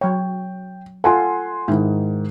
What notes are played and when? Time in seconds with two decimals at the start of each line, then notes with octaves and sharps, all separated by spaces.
0.01 F#3 C#5 G5
1.04 F4 A4 F#5 G#5 C6
1.68 G#2 D#3 E4